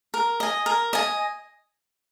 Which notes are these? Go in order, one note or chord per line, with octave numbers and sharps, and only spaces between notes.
A#4
D#5 G#5
A#4
D#5 G#5